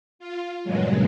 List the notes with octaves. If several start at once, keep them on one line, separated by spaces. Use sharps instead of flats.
F4
E2 G2 A#2 C#3 F#3 G#3